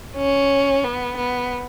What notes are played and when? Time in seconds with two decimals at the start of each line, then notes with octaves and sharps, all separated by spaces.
0.17 C#4
0.84 B3
1.17 B3